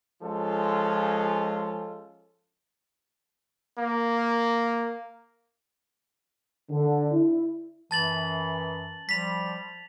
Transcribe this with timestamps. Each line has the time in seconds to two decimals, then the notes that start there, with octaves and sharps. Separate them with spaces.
0.22 F3 G#3 C#4 F4 A4
3.78 A#3
6.70 D3
7.13 E4
7.91 F#2 E3 A5 A6 F#7
9.09 F3 G3 B6 F7